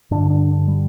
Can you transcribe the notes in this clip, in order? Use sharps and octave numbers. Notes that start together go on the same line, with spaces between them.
G2 D3 D4
D4
G3